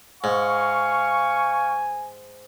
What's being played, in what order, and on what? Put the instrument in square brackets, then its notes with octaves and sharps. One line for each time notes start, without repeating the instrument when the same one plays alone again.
[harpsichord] G#2 [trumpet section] F5 C#6 [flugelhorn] G#5